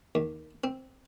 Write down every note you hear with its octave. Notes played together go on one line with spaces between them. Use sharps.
D#2
C4